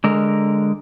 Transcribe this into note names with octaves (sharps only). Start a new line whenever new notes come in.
D3 G#3 A#4